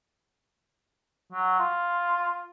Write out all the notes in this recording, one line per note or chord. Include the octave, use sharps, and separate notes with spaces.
F#3
F4